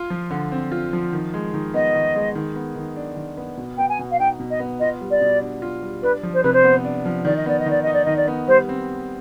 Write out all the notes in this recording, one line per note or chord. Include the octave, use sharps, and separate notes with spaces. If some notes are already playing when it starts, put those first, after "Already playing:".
Already playing: F4
F3
D3
C4
F4
F3
D#3
G#3
D#3
B3 D#5
D#3
G#3
D#3
B3
D#3
D4
D#3
B3
B2
B3 G5
G#5
B2
F5
D#4 G5
B2
D#5
B3
F4 D#5
G3
D5
B2
D4
F4
G3
D4 B4
F3
C5
C3 B4
C5
B3
D4
F3
D#3 D5
D#5
B3 D5
D#5
D#3 D5
D#4 D#5
D5
D#3 D#5
D5
B3
G3 C5
C4